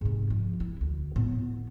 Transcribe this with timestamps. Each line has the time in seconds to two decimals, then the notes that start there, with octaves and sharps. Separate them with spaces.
0.01 G#2 C3
0.30 F3
0.60 E4
0.81 D2
1.16 A2 B3